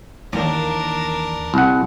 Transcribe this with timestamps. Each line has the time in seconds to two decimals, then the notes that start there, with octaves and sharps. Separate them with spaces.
0.33 D#2 E3 D4 A#4
1.54 C2 F#5